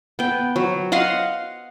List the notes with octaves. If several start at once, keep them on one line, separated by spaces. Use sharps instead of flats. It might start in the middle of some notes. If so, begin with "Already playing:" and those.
B3 G5
F#3
D#5 F5 F#5 C6